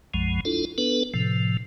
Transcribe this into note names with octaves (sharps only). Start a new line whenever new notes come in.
B1 F#2 F3 G#3
D4 E4 F4 A4
B3 D4 A4 B4
A2 C3 F3